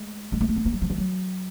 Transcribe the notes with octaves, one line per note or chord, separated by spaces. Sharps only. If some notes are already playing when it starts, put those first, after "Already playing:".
Already playing: G#3
G#3
A3
A#3
B3
A#3
F#3
F3
E3
F#3